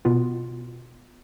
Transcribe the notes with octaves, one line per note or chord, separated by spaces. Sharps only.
B2 B3 F4